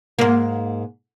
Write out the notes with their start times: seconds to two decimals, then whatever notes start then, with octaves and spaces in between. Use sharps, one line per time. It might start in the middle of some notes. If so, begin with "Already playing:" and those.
0.19 G#2 A#3